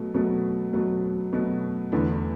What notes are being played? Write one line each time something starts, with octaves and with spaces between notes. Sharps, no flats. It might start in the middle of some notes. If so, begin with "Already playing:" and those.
Already playing: B2 F#3 A3
B2 F#3 A3
B2 F#3 A3
B2 F#3 A3
E2 D3 A3 E4